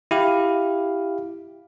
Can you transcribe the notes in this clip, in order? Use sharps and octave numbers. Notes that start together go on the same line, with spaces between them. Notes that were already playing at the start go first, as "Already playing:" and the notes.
E4 G4 F5